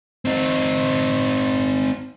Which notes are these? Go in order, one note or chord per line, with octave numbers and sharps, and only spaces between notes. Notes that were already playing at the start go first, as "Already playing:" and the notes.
C4 D#4